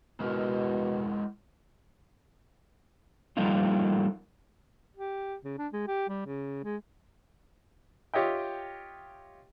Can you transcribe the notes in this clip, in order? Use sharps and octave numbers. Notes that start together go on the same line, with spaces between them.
B2 G#3 E4 A#4
F3 G3 A3 A#3 D#4 F4
G4
C#3
D4
G#3
G4
G3
C#3
G#3
F4 G4 C#5 D#5 E5 G5